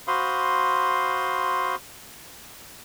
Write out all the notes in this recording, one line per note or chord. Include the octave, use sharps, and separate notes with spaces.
F#4 C5 F5 B5 C6 D#6